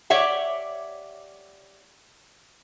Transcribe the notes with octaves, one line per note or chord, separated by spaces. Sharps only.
G4 C#5 D5 E5 F#5